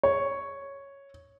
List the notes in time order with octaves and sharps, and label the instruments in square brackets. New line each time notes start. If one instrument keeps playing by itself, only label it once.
[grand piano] C#5